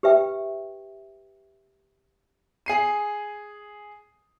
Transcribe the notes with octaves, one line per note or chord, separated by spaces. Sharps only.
G4 B4 E5 G5
G#4 C7 D#7